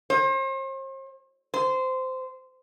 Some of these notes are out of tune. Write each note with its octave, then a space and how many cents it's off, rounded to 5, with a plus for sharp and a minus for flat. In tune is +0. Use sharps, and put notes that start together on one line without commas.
C5 +40
C5 -15